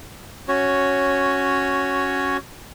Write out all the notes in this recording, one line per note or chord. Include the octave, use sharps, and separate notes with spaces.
C#4 F#4 C#5